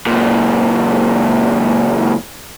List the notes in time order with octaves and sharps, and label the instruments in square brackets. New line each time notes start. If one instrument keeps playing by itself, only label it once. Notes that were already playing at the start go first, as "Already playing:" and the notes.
[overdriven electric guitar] C#2 A#2